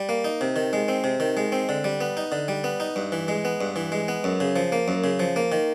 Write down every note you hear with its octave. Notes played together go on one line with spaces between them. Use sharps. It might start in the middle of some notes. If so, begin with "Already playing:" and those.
Already playing: G3
A#3
D#4
C3
D#3
G#3
C4
C3
D#3
G#3
C4
D3
G3
B3
D#4
D3
G3
B3
D#4
G2
E3
G#3
B3
G2
E3
G#3
B3
F#2
C#3
F3
A#3
F#2
C#3
F3
A#3
D#3